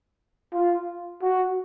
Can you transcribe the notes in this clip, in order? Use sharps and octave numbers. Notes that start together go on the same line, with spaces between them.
F4
F#4